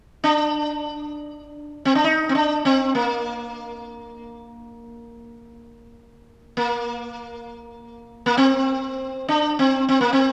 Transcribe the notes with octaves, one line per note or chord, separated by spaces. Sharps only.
D4
C4
D4
D#4
C4
D4
C4
A#3
A#3
A#3
C4
D4
C4
C4
A#3
C4